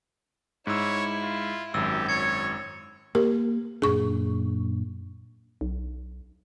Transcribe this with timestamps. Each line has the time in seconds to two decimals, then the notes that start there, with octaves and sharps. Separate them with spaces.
0.67 G#2 E4 C#5 E6
1.23 F4
1.74 G#1 F#2 G4 E6
2.09 C#5 G#6 C#7
3.15 A#3 G4 A#4
3.82 F#2 A#2 D4 G#4 C#6
5.61 B1